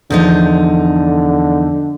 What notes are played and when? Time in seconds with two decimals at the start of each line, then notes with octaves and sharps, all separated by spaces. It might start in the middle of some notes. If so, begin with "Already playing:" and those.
0.10 E2 D3 F3 D#4